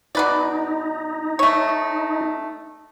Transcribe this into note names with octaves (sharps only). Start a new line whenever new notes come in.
B2 D#4 B4 D5
A3 C#5